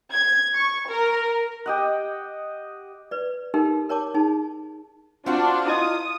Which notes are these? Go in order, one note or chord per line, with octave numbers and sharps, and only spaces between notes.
G#6
C#6
A#4
G4 D#5 F#5
B4 D5
D#4 G4 A4 A#4
A#4 C#5 A5 D6
D#4 G#4 A5
C4 D4 F4 F#4
E4 D#5 D#6